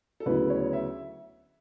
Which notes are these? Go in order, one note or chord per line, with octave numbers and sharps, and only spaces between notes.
A4
D2 C#3 F#3 B3 E4 B4
C#5
E5